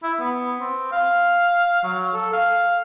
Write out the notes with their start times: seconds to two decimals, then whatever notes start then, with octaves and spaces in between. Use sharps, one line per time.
0.03 E4
0.20 B3
0.60 C4
0.92 F5
1.84 F#3
2.14 A4
2.33 F5